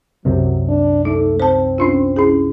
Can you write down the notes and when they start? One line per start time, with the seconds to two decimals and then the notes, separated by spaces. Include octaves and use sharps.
0.25 C2 F#2 C3 F#3
0.69 D4
1.05 A3 D#4
1.40 C4 C5 A5
1.78 C#4 D4 F4
2.16 C#4 E4 G#4